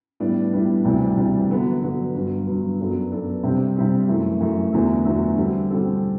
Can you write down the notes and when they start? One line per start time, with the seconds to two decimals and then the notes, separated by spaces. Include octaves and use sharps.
0.20 A2 G3 B3 D4
0.53 A2 G3 B3 D4
0.85 D2 C3 E3 G3 D4
1.17 D2 C3 E3 G3 D4
1.50 D3 F#3 B3 F#4 B4
1.82 D3 F#3 B3 F#4 B4
2.14 G2 F#3 B3
2.46 G2 F#3 B3
2.80 F#2 F#3 B3 D4 A4
3.11 F#2 F#3 B3 D4 A4
3.43 C3 G3 C4 G4
3.76 C3 G3 C4 G4
4.08 F#2 E3 A3
4.41 F#2 E3 A3
4.72 E2 D3 F#3 A3
5.05 E2 D3 F#3 A3
5.37 D3 G3 C4 F#4 A4
5.70 D3 G3 C4 F#4 A4